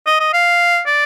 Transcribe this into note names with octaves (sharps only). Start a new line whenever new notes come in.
D#5
D#5
F5
D5